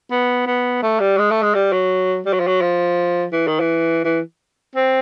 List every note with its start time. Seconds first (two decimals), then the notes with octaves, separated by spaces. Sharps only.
0.11 B3
0.47 B3
0.83 A3
1.00 G3
1.18 G#3
1.31 A3
1.43 G#3
1.55 G3
1.72 F#3
2.25 G3
2.33 F#3
2.40 F3
2.47 F#3
2.61 F3
3.32 E3
3.47 D#3
3.60 E3
4.04 E3
4.75 C4